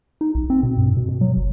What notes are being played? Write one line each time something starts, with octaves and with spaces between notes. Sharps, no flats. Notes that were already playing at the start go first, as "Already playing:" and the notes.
D#4
A#1
C4
B2
G2
B2
B2
F#3
G1